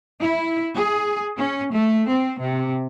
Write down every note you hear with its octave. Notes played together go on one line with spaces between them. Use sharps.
E4
G#4
C#4
A3
C4
C3